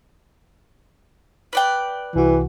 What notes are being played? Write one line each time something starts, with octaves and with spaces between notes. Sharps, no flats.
B4 D5 G5
C2 E3 F#4